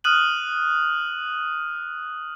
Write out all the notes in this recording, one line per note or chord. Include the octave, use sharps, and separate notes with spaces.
D#6 F6 F#6 D#7 F#7